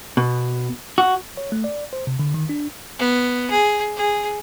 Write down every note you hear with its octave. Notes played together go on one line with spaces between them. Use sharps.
B2
F#4
C#5
A3
D5
C5
C3
D3
D#3
D4
B3
G#4
G#4